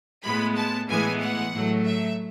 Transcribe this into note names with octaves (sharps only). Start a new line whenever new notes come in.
A2 G#3 B3 B5
A5
A2 E3 G#3 B3 G#5
F#5
A2 F#3 A3
E5